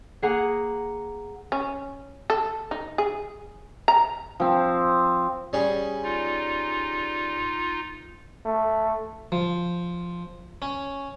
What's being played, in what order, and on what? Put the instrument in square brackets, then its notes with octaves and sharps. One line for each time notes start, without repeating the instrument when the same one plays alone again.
[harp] A#3 G#4 F#5 A#5
[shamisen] C#4
A4
D#4
G#4
A#5
[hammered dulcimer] F3 C4
[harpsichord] G3 C#4 G#4
[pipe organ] D#4 F4
[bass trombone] A3
[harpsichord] F3
C#4